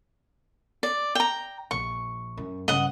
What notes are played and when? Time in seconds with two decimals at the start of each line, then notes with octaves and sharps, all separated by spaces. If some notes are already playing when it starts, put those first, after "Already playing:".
0.83 D5
1.15 G5 A#5
1.71 A#1 C#6
2.37 F#2
2.68 G2 C#3 D#5 F#5